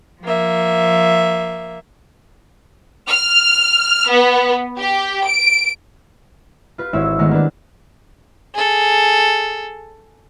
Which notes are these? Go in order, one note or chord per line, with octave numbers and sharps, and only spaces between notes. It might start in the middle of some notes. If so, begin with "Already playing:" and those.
F3 A#3 E5
F6
B3
G4
D7
F4 B4
G#1 C4 E4 C#5 E5
D#3 G#3 A3 B3 C4
A#3 D4 B4
G#4 A4